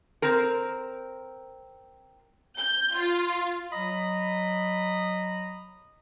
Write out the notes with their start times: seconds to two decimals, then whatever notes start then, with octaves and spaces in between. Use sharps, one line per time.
0.22 C4 A#4
2.58 G6
2.97 F4
3.72 F#3 D#5 A#5 B5 D#6